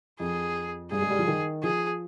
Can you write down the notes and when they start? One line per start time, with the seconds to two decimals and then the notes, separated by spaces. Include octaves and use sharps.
0.19 F2 G#4
0.91 G2 G#4
1.02 G#3
1.10 G3
1.19 F3
1.28 D#3
1.63 F3 G#4